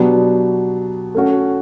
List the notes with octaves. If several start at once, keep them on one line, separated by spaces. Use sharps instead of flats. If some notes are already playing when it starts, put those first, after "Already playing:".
Already playing: B2 F#3 B3 D4 G4
A3 C#4 F#4